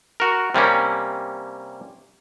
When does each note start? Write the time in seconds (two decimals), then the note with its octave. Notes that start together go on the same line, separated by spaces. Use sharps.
0.20 F#4 A#4
0.55 C3 G3 A#3 C#4